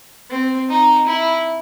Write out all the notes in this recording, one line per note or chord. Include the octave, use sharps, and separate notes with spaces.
C4
D#4
E4